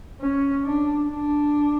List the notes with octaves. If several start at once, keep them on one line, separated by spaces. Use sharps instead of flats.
C#4
D4
D4